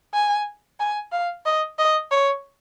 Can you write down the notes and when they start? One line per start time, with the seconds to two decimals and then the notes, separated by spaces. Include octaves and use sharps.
0.14 G#5
0.80 G#5
1.12 F5
1.45 D#5
1.79 D#5
2.11 C#5